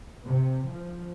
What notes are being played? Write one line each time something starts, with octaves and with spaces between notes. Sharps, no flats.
C3
F3